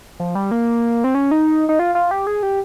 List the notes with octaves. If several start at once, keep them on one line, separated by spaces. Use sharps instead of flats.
F3
G3
A#3
C4
C#4
D#4
D#4
F4
F4
G4
G#4
G4